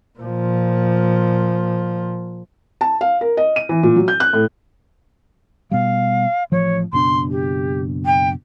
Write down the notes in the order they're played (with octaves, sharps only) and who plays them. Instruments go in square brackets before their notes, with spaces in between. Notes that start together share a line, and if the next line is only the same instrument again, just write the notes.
[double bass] A#2 F3
[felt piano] A5
F5
A#4
D#5
D#7
E3
A#2
F#3
G6
F#6
A2
[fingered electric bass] B2 G3 [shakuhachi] F5
[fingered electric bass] A1 F3 [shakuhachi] C#5
[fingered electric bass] F#1 B2 D4 [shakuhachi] C6
[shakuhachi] G4
G5